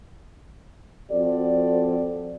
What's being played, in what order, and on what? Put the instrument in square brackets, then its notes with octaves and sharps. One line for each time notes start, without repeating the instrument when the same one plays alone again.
[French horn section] F3 C4 F#4 A4 D5